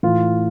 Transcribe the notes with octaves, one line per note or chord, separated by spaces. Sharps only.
A2 E3 F4